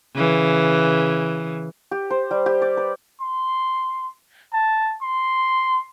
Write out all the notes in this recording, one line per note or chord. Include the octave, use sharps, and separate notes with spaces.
C#3 E3
G4
C5
G3
G4
D5
B4
C6
A5
C6